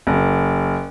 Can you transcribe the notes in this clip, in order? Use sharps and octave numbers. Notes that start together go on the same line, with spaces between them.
F#1